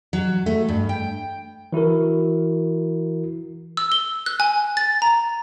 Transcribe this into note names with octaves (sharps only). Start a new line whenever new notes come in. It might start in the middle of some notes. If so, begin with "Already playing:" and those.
F#3
A3
G2
G5
E3 E4 F#4 A#4
E6
G7
F#6
G#5
A6
A#5